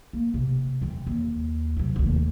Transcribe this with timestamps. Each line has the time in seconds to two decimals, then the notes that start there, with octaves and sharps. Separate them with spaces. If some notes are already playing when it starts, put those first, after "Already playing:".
0.13 A#3
0.34 C3
0.81 E3 C4
1.07 D#2
1.76 C3 F#3
1.96 F1 D#2